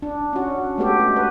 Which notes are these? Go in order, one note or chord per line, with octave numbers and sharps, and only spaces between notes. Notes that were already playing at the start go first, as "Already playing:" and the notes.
D4
C#4 F#4
G#3 A3 B3 G4 A4
F#4
B4